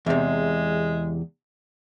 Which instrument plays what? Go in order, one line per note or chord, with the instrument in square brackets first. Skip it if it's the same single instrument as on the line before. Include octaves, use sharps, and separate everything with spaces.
[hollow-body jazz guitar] E2 C3 [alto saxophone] G#3